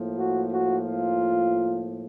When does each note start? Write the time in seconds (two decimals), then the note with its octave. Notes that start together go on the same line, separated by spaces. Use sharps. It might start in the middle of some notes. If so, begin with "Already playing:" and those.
Already playing: A2 F3 A#3
0.15 F#4
0.51 F#4
0.86 F4